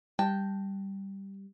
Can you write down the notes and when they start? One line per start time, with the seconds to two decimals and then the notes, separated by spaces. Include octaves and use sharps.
0.19 G3 G5 A5